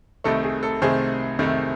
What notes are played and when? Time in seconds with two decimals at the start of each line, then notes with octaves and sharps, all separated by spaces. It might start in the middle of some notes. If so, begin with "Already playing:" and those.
0.24 C2 C3 D#3 A3 A4
0.43 G#4
0.63 A4
0.82 C2 C3 D#3 A3 G#4 C5
1.39 C2 C3 D#3 A3